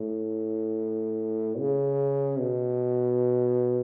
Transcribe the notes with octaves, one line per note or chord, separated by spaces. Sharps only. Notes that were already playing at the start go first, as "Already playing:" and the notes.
Already playing: A2
C#3
B2